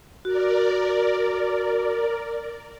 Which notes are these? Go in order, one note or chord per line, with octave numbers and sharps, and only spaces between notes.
F#4 A#4 D5